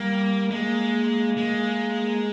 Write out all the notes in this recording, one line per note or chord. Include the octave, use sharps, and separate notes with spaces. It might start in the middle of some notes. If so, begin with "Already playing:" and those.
Already playing: G3 A#3
G#3 A#3
G#3